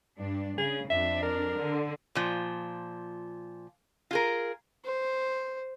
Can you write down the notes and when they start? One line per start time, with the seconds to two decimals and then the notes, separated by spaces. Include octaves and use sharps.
0.19 G2 D4
0.58 C#3 G#4
0.90 F2 D4 E5
1.22 A#4
1.58 D3
2.15 A#2 F3
4.11 F4 G#4 A#4
4.85 C5